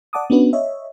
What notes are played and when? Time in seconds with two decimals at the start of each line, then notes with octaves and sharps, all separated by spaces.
0.13 D5 F#5 A5 D6 D#6
0.30 B3 C#4 D4 F#4 B4
0.53 C#5 D#5 E5